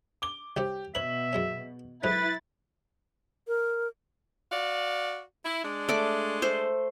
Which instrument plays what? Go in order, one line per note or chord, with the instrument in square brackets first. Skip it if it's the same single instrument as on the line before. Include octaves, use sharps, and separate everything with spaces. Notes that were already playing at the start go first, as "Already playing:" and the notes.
[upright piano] D6 G7
[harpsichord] C2 C3 C#4 [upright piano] G4
[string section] B2 [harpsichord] B4 C#5 [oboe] E5 [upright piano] F#7
[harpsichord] F#2 G#3 C#4
[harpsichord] B1 G#2 A3 [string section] E4 A6 [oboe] B4
[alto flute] A#4
[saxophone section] F#4 D5 F5
E4
G#3 D4
[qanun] A3 D5 D6
A3 C5